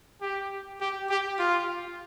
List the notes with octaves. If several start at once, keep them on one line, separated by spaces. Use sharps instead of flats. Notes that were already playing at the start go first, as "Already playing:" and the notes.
G4
G4
G4
F4